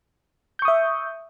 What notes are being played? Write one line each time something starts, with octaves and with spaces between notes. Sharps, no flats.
E5 C#6 D#6 G6